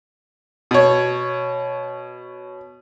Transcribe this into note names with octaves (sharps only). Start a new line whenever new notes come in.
B2 C#5